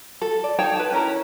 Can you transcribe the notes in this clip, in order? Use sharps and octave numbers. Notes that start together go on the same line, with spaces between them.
A4
D5
D#4 C#5 G5 A5
B4 A5
C#4 E4 A#4 A#5